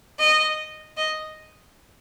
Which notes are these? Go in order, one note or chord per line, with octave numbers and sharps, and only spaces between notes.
D#5
D#5